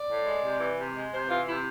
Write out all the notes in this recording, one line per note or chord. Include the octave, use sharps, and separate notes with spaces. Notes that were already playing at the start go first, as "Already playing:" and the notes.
Already playing: D5
A2
G#3
C3
E3
C3
G#3
C3 C5
E3 F4
C3 E4